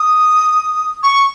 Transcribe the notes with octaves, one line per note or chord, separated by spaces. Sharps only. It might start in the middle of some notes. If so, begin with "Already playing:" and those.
Already playing: D#6
C#6